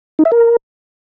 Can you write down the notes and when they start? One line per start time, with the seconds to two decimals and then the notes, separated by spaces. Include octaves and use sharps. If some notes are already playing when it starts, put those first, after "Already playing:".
0.19 D#4
0.25 E5
0.32 A#4